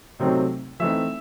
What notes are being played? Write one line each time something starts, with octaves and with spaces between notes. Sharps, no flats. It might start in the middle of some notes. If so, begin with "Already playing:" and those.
C3 F#3 A3 C4 D#4
E3 A3 C4 D#4 E5